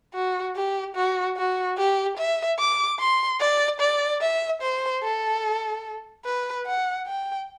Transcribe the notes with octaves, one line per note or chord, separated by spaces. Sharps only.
F#4
G4
F#4
F#4
G4
E5
D6
C6
D5
D5
E5
C5
A4
B4
F#5
G5